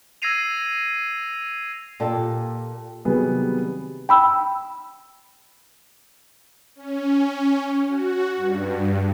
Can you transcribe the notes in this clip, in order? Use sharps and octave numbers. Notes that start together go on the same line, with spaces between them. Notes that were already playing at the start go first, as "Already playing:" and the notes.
E6 G#6 A#6 C7 D#7 F7
A#2 G4 A4
C3 D#3 F#3 G3 B3 G#4
G5 B5 E6
C#4
F#4
G2